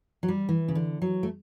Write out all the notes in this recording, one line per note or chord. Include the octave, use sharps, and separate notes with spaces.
F#3
G3
E3
C#3
D3
F#3
A3